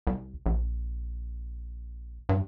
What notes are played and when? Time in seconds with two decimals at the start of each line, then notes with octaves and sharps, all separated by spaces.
0.07 C2
0.46 A#1
2.29 G2